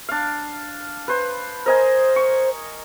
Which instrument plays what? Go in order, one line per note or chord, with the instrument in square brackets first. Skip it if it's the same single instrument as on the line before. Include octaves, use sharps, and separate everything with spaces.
[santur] D4 F5
B4 C5
[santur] A#4 D#5 G#5 [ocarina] C5
[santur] C#6